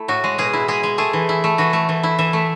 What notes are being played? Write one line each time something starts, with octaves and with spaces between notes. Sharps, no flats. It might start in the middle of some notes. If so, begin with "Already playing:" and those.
Already playing: A3 E4
A2 F#4
G#3
B2 G#4
E4
G#3 G#4
G#3
A3 G#4
E3
E4
A3
E3 F#4
A3
E3
E4
E3 E5
A3